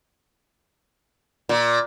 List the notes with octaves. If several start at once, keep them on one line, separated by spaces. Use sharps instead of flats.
A#2